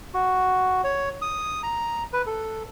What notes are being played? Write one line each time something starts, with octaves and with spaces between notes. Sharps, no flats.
F#4
C#5
D#6
A#5
B4
A4